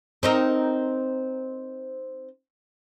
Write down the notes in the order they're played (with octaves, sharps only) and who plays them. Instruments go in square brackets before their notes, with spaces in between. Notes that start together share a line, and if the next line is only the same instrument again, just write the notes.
[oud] C4 D#4 A#4